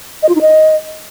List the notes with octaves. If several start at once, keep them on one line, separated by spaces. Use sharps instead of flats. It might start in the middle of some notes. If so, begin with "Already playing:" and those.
D#5
F4
D#4
D#5